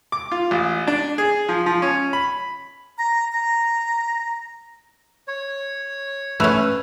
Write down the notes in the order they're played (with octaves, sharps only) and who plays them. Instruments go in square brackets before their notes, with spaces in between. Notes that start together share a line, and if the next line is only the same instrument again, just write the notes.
[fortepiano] D6
F4
A1
D4
G#4
F3
F3
C#4
B5
[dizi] A#5
A#5
[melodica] C#5
[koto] A3 C#4 [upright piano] B4 E6 F7